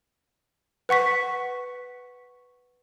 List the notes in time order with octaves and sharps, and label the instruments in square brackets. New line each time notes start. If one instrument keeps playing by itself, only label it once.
[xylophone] B4 F#5 C#6 B6